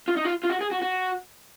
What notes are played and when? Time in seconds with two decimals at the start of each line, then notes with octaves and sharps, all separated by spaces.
0.08 F4
0.17 D#4
0.25 F4
0.44 F4
0.50 F#4
0.61 G#4
0.72 F#4
0.82 F#4